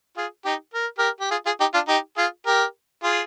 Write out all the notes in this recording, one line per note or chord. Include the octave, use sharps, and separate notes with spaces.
F4 G#4
D#4 G4
A#4
G4 A#4
G4
F4 G#4
F4 G#4
D#4 G4
D4 F4
D#4 G4
F4 G#4
G4 A#4
F4 G#4